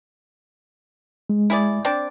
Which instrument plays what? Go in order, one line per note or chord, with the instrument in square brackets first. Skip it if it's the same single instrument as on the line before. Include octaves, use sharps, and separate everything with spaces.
[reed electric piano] G#3
[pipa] E4 G#4 D5
C4 D4 D5